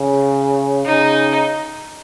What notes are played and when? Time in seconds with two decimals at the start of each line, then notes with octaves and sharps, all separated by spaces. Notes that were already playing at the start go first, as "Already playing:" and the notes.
Already playing: C#3
0.86 C#3 D#4